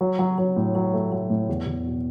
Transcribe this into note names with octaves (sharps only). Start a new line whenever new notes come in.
F#3
F#3
F#3
A2
F#3
A3
F#3
A2
E2
E2
B2